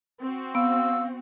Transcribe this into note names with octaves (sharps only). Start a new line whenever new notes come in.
C4 F#4
B3 F5 E6